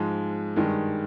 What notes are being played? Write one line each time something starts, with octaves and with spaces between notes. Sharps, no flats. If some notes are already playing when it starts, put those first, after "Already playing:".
Already playing: G#2 F3 G#3
G2 D#3 G#3